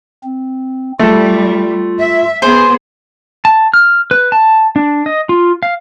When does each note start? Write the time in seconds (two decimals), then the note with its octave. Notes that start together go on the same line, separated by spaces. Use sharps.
0.24 C4
0.99 G3 A3 F4 A4
1.98 E5
2.42 B3 G#4 C5
3.45 A5
3.74 F6
4.11 B4
4.32 A5
4.76 D4
5.06 D#5
5.29 F4
5.63 F5